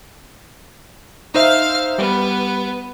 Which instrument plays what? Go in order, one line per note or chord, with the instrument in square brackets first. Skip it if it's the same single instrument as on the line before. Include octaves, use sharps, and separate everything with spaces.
[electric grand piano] D#4 C5 E5 [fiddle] F5 F6
[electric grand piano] G3 [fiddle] B3